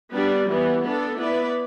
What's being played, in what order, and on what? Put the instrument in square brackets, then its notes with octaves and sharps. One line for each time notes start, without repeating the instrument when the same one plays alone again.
[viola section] G3 B3 D4
E3 G3 B3
B3 D4 A4
B3 E4 B4 D5